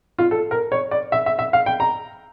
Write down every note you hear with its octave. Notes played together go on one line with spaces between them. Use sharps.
F4
A4
A#4
C#5
D5
E5
E5
E5
F5
G5
A#5